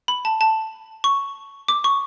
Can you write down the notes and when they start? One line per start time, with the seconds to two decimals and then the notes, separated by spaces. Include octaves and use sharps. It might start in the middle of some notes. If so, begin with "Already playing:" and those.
0.08 B5
0.25 A5
0.41 A5
1.04 C#6
1.68 D6
1.84 C#6